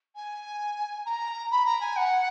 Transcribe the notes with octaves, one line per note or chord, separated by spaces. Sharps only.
G#5
A#5
B5
A#5
G#5
F#5